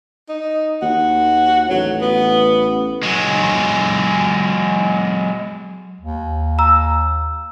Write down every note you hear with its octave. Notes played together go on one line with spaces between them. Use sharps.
D#4
D#2 F#4
A1 F#3
B3
F#3 G#3
D#2
A#5 E6